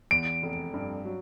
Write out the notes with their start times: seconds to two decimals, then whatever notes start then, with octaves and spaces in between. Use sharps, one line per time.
0.11 E2 D7
0.43 F1
0.74 G2
1.05 F#3